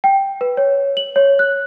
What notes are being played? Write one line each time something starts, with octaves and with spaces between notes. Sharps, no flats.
G5
B4
C#5
F#7
C#5
F#6